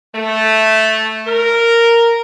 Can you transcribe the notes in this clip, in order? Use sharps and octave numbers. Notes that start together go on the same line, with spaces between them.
A3
A#4